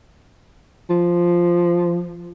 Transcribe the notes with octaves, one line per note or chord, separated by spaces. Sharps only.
F3